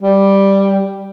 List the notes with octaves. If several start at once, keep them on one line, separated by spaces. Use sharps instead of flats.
G3